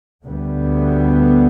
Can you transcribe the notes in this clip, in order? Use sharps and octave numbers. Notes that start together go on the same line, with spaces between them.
D2 D3 G3 B3